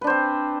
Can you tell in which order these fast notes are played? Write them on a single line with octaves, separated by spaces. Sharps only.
B4 D4 C5 C4